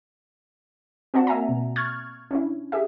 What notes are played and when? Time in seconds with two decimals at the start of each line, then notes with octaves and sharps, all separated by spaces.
1.14 C4 F#4 D5 F#5 A5
1.27 A#3 E5 G#5 A#5
1.49 B2
1.76 C#6 F6 F#6 G#6 A6
2.31 C#4 D4 E4
2.72 G4 G#4 E5